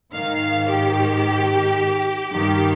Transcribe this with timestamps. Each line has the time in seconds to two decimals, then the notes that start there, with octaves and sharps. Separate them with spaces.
0.13 G#2 D#3 F5
0.68 G4
2.31 G2 D#3 G4